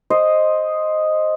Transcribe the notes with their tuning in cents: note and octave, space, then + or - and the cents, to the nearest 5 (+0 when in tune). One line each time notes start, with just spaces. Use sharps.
C5 +5 D#5 +0